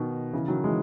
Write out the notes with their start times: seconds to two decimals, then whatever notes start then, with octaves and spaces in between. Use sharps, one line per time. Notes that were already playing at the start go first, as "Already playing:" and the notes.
Already playing: B2 D#3
0.33 C#3 E3
0.48 D#3 F#3
0.64 E3 G#3